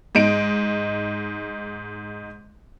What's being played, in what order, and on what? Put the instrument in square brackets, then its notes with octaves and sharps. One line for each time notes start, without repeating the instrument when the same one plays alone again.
[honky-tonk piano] G#2 D#4 D7